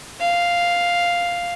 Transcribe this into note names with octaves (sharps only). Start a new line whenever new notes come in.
F5